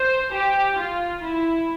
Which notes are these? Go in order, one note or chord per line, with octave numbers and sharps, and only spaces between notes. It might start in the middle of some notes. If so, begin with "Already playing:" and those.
Already playing: C5
G4
F4
E4